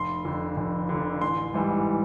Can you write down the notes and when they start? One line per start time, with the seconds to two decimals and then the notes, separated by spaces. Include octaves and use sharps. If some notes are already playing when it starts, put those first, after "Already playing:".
Already playing: F1 C6
0.25 F2 D3
0.57 F1
0.89 D3
0.94 F2
1.21 A1 C6
1.54 G#2 E3 G3